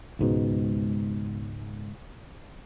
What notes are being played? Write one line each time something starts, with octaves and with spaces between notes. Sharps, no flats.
C#2 G#2 B2